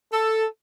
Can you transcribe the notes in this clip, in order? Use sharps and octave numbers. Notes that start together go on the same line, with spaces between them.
A4